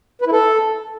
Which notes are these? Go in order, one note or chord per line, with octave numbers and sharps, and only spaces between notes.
B4
E4
A4